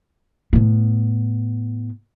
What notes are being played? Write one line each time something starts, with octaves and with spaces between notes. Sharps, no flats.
A2 B3